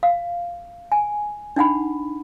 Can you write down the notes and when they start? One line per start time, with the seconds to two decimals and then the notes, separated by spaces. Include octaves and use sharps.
0.03 F5
0.92 G#5
1.56 D4 D#4 F#5 B5